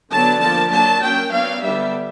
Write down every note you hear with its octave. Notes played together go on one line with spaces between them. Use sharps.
D3 F#3 B3 D4 A5
F3 A#3 D4 A5
F#3 A#3 D4 A5
F#3 A#3 C#4 G5
F#3 B3 D4 F5
D3 G3 B3 D4 E5